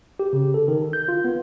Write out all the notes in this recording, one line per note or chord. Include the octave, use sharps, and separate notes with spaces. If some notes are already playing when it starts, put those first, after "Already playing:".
G4
C#3
A4
D#3
G6
F4
B3